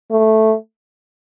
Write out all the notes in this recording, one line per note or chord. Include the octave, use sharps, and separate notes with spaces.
A3